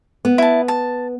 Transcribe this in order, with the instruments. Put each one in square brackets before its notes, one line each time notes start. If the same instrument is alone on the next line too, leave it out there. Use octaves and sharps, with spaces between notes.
[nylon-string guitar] B3
[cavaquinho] E4 A5
A5